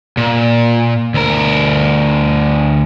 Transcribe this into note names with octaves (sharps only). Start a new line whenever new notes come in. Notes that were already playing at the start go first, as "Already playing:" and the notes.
A#2
D2 A#4